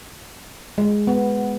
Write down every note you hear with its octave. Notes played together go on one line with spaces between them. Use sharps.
G#3
B3